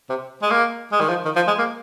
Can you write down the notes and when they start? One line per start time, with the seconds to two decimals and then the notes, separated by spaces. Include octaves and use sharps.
0.09 C3
0.42 G#3
0.51 A#3
0.92 G#3
1.00 D#3
1.09 F3
1.25 D#3
1.36 F3
1.48 G#3
1.58 A#3